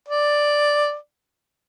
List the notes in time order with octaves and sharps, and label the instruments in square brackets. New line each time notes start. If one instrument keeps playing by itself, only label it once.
[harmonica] D5